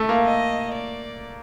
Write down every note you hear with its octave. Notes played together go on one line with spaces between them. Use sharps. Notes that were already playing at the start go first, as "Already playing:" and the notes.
Already playing: A3 E5
A#3
D#5
D5